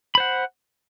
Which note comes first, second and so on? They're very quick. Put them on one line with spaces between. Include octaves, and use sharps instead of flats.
B5 C5 F#5